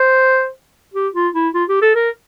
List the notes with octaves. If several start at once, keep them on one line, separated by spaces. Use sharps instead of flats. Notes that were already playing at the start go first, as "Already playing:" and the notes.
Already playing: C5
G4
F4
E4
F4
G4
A4
A#4